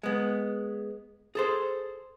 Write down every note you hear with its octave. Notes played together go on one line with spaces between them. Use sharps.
G#3 B3
G#4 A4 C5